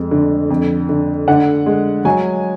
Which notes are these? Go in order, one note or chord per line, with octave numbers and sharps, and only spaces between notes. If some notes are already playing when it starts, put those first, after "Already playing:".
Already playing: F2 G#3
D3
F2
D3
D3 F#5
G#3
F#3 G#5